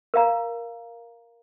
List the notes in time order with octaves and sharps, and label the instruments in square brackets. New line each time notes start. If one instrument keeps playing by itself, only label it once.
[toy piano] A#4 F5 A#5